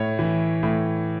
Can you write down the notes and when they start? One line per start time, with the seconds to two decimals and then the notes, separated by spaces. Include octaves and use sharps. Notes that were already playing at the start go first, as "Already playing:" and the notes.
Already playing: A2 C#5
0.19 E3
0.63 A2